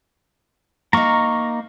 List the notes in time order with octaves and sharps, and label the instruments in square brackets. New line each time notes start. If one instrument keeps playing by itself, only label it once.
[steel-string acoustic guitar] A#3 D#4 [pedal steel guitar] A#5 C#6